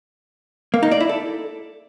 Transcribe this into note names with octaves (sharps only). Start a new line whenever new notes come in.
A#3
D#4
D5
E4
A4